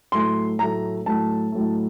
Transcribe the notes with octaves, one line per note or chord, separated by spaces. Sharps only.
A2 F#3 A3 C6
A2 F#3 A3 A#5
A2 F#3 A3 A5
A2 F#3 A3